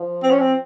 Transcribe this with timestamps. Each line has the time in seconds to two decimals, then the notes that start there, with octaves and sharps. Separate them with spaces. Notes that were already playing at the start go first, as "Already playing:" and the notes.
Already playing: F3
0.23 C4
0.31 C#4
0.39 C4